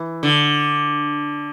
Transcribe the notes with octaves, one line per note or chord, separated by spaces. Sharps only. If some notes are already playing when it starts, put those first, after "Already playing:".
Already playing: E3
D3